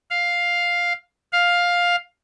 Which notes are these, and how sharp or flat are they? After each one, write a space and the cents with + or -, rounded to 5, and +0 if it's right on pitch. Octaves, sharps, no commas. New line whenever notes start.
F5 +5
F5 +10